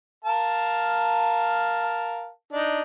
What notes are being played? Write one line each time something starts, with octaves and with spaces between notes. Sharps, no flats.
A#4 F5 A5
D4 D#4